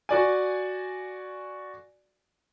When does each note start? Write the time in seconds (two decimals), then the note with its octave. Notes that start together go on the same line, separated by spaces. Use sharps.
0.09 F#4 D5 G#5